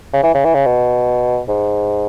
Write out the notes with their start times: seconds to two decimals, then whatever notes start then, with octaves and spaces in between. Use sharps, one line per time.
0.13 C#3
0.23 E3
0.34 C#3
0.45 E3
0.54 C#3
0.65 B2
1.48 G#2